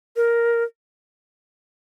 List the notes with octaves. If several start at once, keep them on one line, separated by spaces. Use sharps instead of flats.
A#4